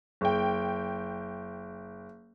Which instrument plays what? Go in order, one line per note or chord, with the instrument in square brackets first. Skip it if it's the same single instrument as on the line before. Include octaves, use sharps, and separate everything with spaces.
[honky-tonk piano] F#1 G5